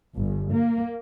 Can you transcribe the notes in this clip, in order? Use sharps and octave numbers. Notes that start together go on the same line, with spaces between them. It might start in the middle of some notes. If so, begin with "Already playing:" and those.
G1
A#3